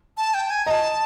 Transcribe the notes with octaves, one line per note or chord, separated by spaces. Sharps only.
A5
G5
G#5
D#5 A5 A#5